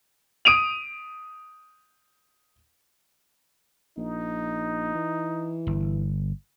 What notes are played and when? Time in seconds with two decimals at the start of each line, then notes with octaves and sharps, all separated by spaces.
0.45 D#6 D7 D#7 F7
3.97 A#1 D#4
4.95 E3
5.67 G1